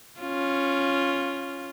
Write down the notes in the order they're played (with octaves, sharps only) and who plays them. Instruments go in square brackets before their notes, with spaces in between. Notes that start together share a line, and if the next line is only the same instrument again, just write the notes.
[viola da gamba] C#4 F4